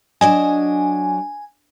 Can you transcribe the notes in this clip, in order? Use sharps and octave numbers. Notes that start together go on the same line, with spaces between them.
F#3 D4 D#5 G#5